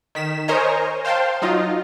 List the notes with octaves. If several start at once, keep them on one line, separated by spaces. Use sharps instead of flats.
D#3 B6 E7
A#4 C5 C#5 D#5 G#5 A#5
C5 F5 G5 A5 C6
F#3 D#4 F4 D#5